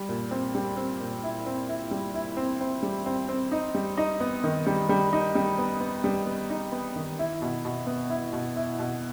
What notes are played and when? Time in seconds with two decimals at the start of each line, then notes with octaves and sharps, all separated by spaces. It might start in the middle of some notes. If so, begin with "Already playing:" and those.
Already playing: G3
0.09 A#2
0.31 C4
0.55 G3
0.77 C4
1.00 A#2
1.23 E4
1.46 C4
1.69 E4
1.91 G3
2.15 E4
2.37 C4
2.61 C4
2.83 G3
3.06 C4
3.29 C4
3.52 D#4
3.75 G3
3.98 D#4
4.20 B3
4.44 D#3
4.67 G3
4.89 G3
5.13 D#4
5.35 G3
5.58 B3
5.80 B3
6.04 G3
6.26 B3
6.50 D#4
6.72 B3
6.96 D#3
7.19 E4
7.42 B2
7.65 B2
7.87 B3
8.10 E4
8.33 B2
8.56 E4
8.79 B2